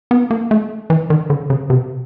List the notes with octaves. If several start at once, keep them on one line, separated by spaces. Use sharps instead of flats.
B3
A#3
A3
E3
D#3
D3
C#3
C3